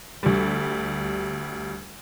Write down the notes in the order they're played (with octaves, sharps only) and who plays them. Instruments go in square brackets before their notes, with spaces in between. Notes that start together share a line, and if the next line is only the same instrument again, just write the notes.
[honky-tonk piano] D2 G3